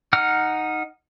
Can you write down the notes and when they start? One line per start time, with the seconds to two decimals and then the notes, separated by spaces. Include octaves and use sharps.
0.13 D#4 F#5 F6